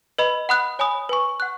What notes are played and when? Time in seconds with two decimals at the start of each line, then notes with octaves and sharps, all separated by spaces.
0.19 B4 D#5 B5
0.49 F#5 B5 D#6 F#6
0.79 C#5 G#5 B5 D#6
1.09 B4 G#5 C#6
1.40 F#5 C#6 F#6